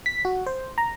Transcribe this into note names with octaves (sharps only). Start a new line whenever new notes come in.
B6
F#4
C5
A#5